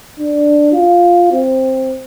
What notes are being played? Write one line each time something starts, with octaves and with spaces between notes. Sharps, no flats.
D4
F4
C4